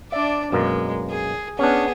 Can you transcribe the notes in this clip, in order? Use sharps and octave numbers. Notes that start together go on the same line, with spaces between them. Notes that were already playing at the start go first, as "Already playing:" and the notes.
D4 D5 E5
F#2 B2 G#3 A#3
G#4
B3 C#4 D4 G#4